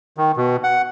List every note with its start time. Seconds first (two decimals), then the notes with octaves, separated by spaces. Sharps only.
0.17 D#3
0.36 B2
0.64 F#5